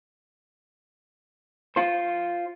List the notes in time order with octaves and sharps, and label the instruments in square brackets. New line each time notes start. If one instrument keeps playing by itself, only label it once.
[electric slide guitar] F4 C5